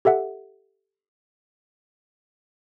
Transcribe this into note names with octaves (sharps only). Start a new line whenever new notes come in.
G4 A4 E5 F#5